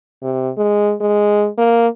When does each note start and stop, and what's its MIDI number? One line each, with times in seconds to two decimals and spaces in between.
0.23 0.50 48
0.57 0.94 56
1.01 1.48 56
1.58 1.87 58